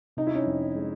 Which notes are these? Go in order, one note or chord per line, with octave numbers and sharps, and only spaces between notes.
C3 D#4
E4
C#4 D#4
F2
G#3